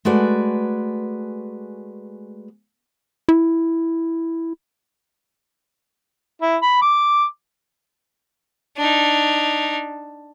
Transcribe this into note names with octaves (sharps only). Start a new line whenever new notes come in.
G#3 A3 F#4 B4 D5
E4
E4
B5
D6
D4 D#4